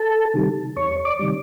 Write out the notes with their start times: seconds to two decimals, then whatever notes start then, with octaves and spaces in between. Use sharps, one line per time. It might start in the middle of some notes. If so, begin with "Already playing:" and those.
Already playing: A4 A5
0.34 C3 D#3 G3
0.76 E2 C#5 C#6
1.05 D5 D6
1.19 C3 D#3 G3